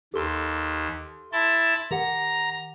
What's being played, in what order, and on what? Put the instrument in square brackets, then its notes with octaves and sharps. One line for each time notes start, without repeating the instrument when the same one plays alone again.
[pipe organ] D#2 [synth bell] G4 A4 C6
[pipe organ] E4 A5 [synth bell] C6
[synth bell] D#3 G4 F#5 [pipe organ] A#5 A#6